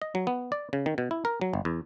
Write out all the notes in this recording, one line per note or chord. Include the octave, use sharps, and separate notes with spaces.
D#5
F#3
B3
D5
C#3
D#3
B2
E4
A#4
F#3
G1
E2